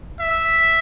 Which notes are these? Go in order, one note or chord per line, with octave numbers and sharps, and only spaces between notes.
E5